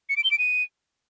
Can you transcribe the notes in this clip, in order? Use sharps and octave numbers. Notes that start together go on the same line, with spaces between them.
C#7
D7
G7
D7
D#7